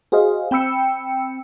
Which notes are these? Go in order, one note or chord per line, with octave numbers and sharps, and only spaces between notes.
F#4 G#4 C5 D#5 F5
C4 G5 B5 E6 C#7